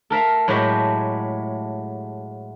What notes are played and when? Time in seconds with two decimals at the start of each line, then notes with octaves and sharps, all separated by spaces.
0.10 A4 A#4 E5 F5
0.48 A2 F#3 G#3 A3 F#4 G4